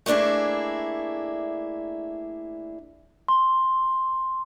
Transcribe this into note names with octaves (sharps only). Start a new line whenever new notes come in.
A3 A#3 D4 E4 G#4
C6